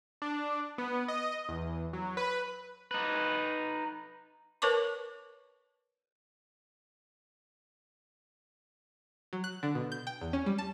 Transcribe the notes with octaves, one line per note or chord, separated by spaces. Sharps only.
D4
B3
D#5
E2
F#3
B4
D#4 B4
A#4 B4 C#5 A5 C#6 D6
F#3
F#6
D3
B2
G6
G5
E2
C#4
G3
A5